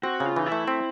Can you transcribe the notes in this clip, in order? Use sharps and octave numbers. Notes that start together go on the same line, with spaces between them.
C4 F#4
C#3
F4
E3 D#4
E4
A3
C4